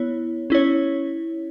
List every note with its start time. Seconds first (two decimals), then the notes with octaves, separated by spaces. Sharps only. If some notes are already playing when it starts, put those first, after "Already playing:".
Already playing: B3 E4 C#5
0.50 C#4 E4 C#5